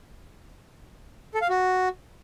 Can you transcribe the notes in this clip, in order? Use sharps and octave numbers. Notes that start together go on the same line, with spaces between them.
A4
F5
F#4